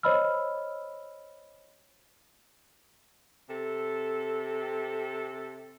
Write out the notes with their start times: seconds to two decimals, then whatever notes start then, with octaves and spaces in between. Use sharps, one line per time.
0.03 C5 C#5 D#5 B5 E6 F6
3.49 C3 A4